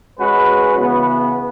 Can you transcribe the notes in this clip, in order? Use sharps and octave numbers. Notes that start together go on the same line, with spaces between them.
G#3 C#4 F#4 B4
C#3 E3 B3